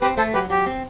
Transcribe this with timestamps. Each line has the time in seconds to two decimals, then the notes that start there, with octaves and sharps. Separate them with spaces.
0.01 C4 G4 B4
0.17 A3 A4 C5
0.34 F#3 G4 B4
0.50 F#3 G4
0.66 C4